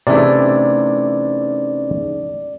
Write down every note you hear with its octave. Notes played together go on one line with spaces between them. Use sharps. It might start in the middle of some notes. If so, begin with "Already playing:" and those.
C3 E3 A3 C#4 D#4 G#4 D5